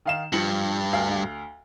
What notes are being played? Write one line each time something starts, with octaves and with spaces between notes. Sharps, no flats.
D#3 F5 E7
G2 F3 C#7 F#7
D2 F5